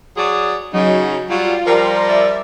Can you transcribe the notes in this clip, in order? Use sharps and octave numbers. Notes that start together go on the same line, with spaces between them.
F#3 G#4 D5
C#3 F#3 D#4
F#3 G3 F4
F3 G3 A#4 A#5 C6
D5 E5